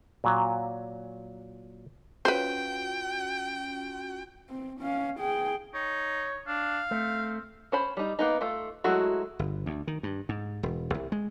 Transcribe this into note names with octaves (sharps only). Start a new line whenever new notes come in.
A#2 F#3
C#4 F4 F#4 B4 C5 G5
C4
C#4 F5
G#4 G5
D#4 C#5
D4 F5
A3 C4
C#4 C5 B5
G3 D#4
A#3 B3 D#4
A3 F4
F#3 G#3 A3 E4 F#4
G1
D2
D#3
G2
G#2
E1
C2
G#3